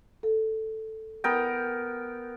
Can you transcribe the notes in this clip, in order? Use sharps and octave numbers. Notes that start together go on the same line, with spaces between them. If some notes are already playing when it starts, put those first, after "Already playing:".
A4
B3 A#4 G5